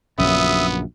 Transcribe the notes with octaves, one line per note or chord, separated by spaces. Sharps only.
A#1 F#2 C#3 B3 E5 D#6